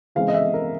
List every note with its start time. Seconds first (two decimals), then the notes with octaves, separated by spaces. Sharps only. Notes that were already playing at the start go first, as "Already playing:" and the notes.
0.15 C#3 E3 G#3 C4 F5
0.28 D#5
0.34 E5
0.54 A#4